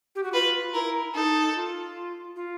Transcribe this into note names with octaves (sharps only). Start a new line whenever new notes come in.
G4
F#4
F4 B4
E4 A#4
D#4 A4
F4
F4